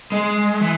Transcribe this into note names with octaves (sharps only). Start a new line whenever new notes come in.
G#3
E3